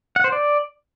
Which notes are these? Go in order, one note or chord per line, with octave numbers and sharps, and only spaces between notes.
F#5
C5
D5